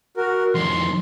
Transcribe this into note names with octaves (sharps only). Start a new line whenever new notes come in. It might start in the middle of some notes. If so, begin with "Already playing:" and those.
F#4 A#4
F2 D#3 C6